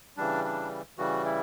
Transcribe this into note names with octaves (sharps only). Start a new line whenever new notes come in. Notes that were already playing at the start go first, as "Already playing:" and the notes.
C#3 E3 G3 D4
D4
C#3 E3 G3 F#4
E4